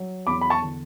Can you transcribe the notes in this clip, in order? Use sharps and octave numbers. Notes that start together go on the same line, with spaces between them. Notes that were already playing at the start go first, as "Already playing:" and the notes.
Already playing: F#3
E2 B5 D6
B5
A5 C#6
D3